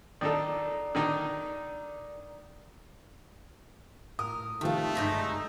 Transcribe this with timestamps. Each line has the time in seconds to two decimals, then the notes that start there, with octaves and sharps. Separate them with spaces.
0.21 D#3 D4 A4 D5 A#5
0.95 D3 D#3 D#4
4.19 A2 A#4 D#6
4.61 C3 D#3 F3 A3 F4
4.95 G2 D3 G#3 D#4 A#5 G6 A#6 B6